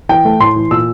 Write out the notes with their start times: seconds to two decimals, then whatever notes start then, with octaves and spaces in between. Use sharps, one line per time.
0.09 E3 G5
0.25 A3
0.40 A2 C6
0.56 E3
0.71 A#2 E6